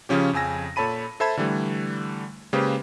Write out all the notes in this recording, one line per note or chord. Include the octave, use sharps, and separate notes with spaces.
C#3 F3 C#4 G4
F2 C#3 G#5 E6 A#6
A#2 A4 C#5 A5 B5 D#7
A4 C5 E5 A5 B5 G#6
D3 E3 G3 A3
C#3 G#3 A#3 G4 B4 C5